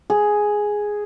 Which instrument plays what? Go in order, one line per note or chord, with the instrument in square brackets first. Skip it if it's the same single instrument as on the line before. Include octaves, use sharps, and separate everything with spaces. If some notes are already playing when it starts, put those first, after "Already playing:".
[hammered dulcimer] G#4